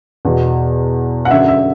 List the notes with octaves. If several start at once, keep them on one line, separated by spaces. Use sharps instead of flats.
E2 B2
F#5
F#2 D3 E5
E5